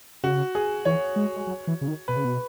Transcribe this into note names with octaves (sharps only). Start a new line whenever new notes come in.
C#3 F#4
G#4
E3 C#5
G#3
G#3
F#3
E3
C#3
D#3
B2 B4
C#3
B2